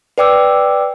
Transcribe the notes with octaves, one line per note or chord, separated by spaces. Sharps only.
B4 D5 G5 D6 E6